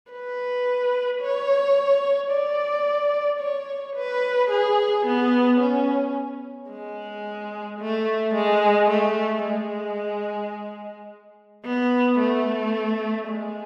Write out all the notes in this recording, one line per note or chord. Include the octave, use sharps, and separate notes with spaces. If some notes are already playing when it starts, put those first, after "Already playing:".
B4
C#5
D5
C#5
B4
G#4
B3
C#4
G#3
A3
G#3
A3
G#3
B3
A3
G#3